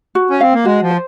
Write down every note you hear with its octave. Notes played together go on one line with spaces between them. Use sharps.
F#4
C#4
C4 F5
A#3
G#3 F#4
F3
C5